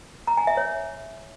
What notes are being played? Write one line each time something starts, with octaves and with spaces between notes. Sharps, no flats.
A#5
G#5
E5
C#5